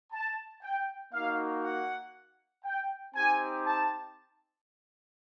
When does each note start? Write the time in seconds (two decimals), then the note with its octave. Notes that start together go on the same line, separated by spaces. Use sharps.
0.12 A5
0.62 G5
1.13 A#3 D#4 F#4 F5
1.64 F#5
2.64 G5
3.15 C4 D#4 G4 G#5
3.67 A5